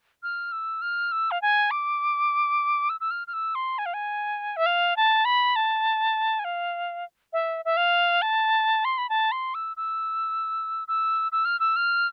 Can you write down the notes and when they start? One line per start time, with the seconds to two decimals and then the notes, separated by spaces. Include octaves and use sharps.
0.23 F6
0.52 E6
0.81 F6
1.12 E6
1.31 F5
1.42 G#5
1.71 D6
2.89 E6
3.00 E6
3.11 F6
3.27 F6
3.33 E6
3.55 C6
3.78 G#5
3.86 F5
3.94 G#5
4.56 E5
4.66 F5
4.96 A5
5.25 B5
5.56 A5
6.39 G#5
6.44 F5
7.33 E5
7.65 E5
7.77 F5
8.22 A5
8.85 C6
8.98 B5
9.09 A5
9.32 C6
9.54 E6
9.77 E6
10.88 E6
11.32 E6
11.45 F6
11.60 E6
11.76 F6